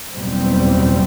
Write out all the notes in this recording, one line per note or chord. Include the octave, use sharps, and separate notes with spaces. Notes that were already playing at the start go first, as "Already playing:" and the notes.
F#1 E2 B2 G3 C4